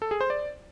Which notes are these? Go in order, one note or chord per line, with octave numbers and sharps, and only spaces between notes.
A4
G#4
C5
D5